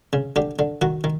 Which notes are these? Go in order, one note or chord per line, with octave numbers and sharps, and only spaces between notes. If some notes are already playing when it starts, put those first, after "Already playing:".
C#3
D3 G4
D3
D#3 F#4
D#3